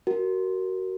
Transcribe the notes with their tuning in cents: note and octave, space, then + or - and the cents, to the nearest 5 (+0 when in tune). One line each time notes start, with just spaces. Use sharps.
F#4 +25 A#4 +0